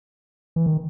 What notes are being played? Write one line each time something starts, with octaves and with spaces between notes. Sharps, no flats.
E3
D#3